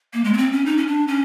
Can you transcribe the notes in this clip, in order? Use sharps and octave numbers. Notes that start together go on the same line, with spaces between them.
A#3
G#3
B3
C4
C#4
D#4
C#4
D4
C#4